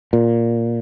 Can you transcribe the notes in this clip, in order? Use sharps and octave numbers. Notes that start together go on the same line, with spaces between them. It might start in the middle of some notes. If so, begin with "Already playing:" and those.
A#2